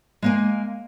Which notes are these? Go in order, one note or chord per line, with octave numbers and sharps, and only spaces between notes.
G#3 A#3 G#5